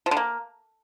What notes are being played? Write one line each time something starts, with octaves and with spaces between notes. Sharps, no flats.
F3
D3
A#3